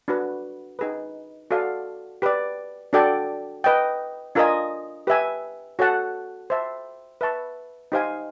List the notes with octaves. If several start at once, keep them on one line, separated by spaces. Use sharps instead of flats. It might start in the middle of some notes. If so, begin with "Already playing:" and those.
D4 F#4 B4
D#4 G#4 B4
F#4 A4 D5 F5
G4 B4 D5
D4 F#4 A4 D5 G5
B4 D#5 G5
D4 F4 A#4 D#5 G#5
G4 B4 E5 G#5
F#4 A4 C#5 F#5 A5
C5 E5 A5
B4 E5 A5 C#6
D#4 G4 C5 F5 G#5